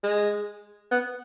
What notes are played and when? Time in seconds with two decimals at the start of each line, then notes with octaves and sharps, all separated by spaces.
0.04 G#3
0.91 B3